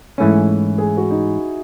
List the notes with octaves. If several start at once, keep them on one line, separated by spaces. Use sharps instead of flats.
G#2 E3 A3 C#4 E4
G#4
F#4
D#4